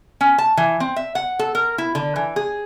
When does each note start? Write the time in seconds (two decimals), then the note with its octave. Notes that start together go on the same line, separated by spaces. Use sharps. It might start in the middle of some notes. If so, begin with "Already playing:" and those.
0.21 C#4
0.38 A5
0.57 E3
0.80 C4
0.96 E5
1.15 F#5
1.39 A4
1.55 A#4
1.78 E4
1.95 D3
2.16 E3
2.36 G#4